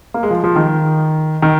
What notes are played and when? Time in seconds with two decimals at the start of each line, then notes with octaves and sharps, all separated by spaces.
0.14 A#3
0.23 G#3
0.31 F3
0.44 F3
0.56 D#3
1.42 D#3